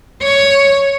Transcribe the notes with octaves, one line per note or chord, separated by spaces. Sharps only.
C#5